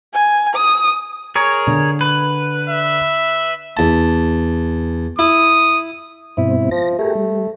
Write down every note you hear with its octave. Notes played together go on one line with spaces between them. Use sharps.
G#5
D#6
G#4 A#4 C#5
D3
B4
E5
E2 A5
E4 D#6
G2 B2 C4 E4
F3 A#6
A3 G4 G#4 A#4
G3